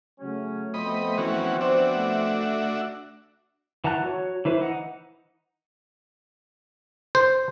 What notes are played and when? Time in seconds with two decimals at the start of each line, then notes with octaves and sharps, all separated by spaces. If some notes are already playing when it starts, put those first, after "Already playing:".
0.20 C#3 F#3 A3 C#4
0.74 F3 B3 C4 D#5 B5
1.18 E3 C#4 F#4
1.61 D4 F#4 C5 E5
1.92 A3
3.84 E3 F#5 A5 A#5 F#6
4.03 F#4 C#5
4.45 E3 E4 B4 C5
4.61 E3 D#4 F#5
7.15 C5